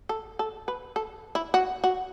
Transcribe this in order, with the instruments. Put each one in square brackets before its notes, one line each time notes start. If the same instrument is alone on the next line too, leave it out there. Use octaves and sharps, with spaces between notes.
[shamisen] A4
A4
B4
A4
E4
F#4
F#4